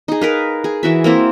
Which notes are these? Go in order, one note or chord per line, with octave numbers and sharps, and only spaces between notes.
D#4 G#4
A#4 B4 F5
G#4
E3 F#4 E5
A#3 C4 E4